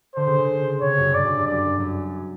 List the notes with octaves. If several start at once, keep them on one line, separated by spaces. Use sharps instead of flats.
D3 C5
C#3
C#3
C3 C#5
F#2
G2 D5
F#2
G2
F#2 D5
F#2